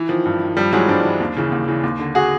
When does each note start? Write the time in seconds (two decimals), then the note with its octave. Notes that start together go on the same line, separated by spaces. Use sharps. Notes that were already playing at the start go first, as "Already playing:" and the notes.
Already playing: E3
0.09 D#3 F3
0.25 G2
0.41 D#3
0.57 G2 F3 G3
0.73 E3 F#3 G#3
0.88 G2 C4 D4
1.04 E3
1.20 D#2
1.37 C#3 E3
1.52 D#2
1.68 C#3 E3
1.83 D#2
1.99 D3
2.15 F#4 G#4